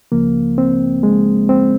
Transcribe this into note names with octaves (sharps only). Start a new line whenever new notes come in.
C#2 C#3 F3 A#3
C4
G#3
C4